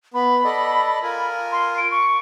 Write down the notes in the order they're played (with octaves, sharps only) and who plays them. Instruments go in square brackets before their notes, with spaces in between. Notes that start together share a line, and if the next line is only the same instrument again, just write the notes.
[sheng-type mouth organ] B3 [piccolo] B5
[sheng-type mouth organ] A4 D5 D#5
F4 A#4 G#5
[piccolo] C6
D7
C#6